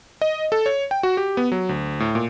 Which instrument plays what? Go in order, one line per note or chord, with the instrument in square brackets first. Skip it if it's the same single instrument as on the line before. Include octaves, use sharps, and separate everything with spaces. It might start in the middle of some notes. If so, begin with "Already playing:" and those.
[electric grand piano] D#5
A4
C#5
G5
F#4
G4
B3
F#3
D2
A2
A#2